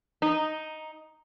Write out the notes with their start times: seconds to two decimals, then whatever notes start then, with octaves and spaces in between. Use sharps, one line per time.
0.22 D#4